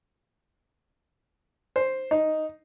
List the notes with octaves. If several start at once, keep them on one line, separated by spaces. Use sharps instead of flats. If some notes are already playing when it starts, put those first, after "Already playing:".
C5
D#4